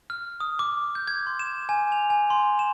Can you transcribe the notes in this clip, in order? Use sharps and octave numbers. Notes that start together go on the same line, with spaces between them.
F6
D#6
D6
G6
G#6
C6
E7
G#5
F7
G#5
C6
E7